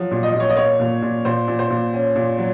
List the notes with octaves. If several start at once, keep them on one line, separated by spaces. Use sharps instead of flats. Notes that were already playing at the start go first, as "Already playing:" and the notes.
Already playing: F3 F#3
A#2
D#5
A#2
C#5
D#5
A#3 C#5
A#2
A#2
A#2 C5
A#2
C5
A#2
C#4
A#2
F#3